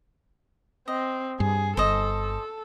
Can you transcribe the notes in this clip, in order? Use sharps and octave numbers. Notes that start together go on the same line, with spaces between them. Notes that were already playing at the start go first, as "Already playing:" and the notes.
C4 D#5
G2 G#4
G1 A4 C5 D#5